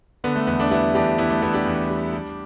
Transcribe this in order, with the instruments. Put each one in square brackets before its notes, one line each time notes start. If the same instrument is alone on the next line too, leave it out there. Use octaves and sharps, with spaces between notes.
[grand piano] D3 B3
A3
E2 B3
A3 D4
G3 B3 E4
E2 D4 G4
E2 B3 E4
A3 D4
E2 B3 E4
D4 G4
E2
G3
G3